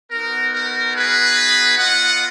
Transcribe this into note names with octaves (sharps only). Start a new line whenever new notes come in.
B3 D#4 F#4 A#4
A#4
G#4 B4
B3 F4 D#5 F#5